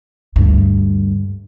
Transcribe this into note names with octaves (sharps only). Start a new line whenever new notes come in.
D2 G2